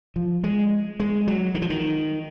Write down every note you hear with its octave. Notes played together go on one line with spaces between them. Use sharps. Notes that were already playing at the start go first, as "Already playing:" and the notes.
F3
G#3
G#3
F#3
D#3
F3
D#3